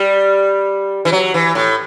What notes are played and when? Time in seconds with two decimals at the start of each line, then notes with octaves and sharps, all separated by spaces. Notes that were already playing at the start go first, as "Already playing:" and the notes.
Already playing: G3
1.05 E3
1.12 F#3
1.34 E3
1.55 A2